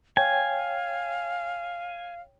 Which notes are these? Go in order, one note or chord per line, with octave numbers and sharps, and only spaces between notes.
C#5 F5 G5 G#5